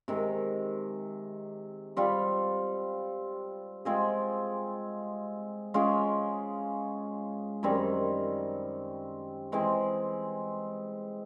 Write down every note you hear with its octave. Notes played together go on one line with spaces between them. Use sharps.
C3 D#3 G#3
G3 C4 F4
G#3 C4 F4 G#4
G#3 C#4 F4 G#4
F#2 D#3 G3 C4
E3 G#3 C4